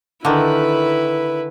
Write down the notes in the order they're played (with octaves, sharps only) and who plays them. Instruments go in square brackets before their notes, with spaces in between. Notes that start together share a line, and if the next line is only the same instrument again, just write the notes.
[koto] D3 D#3 [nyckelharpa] E4 B4